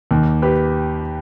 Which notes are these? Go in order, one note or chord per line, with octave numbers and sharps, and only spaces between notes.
D#2
G4 B4